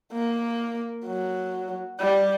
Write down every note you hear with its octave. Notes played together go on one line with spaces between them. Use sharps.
A#3
F#3
G3